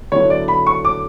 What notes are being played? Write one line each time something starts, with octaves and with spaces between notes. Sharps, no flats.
D3 F#3 B3 E4 C#5
D5
B5
C#6
D6